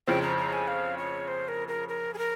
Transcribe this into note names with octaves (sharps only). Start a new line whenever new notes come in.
F2 C#3 F3 C4 G5
A#5
A#5
G#5
F5
C#5
C5
A#4
A#4
A#4
G#4
A#4